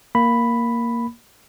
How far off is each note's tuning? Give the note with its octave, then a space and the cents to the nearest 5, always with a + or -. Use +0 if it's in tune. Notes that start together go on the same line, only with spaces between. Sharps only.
A#3 +0 B5 +0